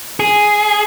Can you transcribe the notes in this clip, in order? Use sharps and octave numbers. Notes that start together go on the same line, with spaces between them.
G#4